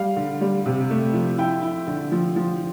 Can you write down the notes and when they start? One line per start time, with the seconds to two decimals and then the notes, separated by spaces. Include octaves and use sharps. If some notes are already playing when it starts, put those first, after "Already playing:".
Already playing: G3 F5
0.16 D3
0.41 G3
0.66 C3
0.90 A3
1.13 F3
1.38 E4 G5
1.62 E4
1.87 D3
2.12 F3
2.36 F3